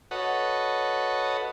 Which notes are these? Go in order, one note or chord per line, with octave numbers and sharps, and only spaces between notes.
F#4 A4 B4 C#5 D#5 F#5